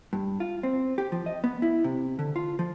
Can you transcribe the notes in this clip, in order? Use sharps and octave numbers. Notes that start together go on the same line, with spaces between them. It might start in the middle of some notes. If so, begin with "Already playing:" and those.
G2
F4
C4
G4
F3
D#5
B3
E4
C3
D3
F4
F3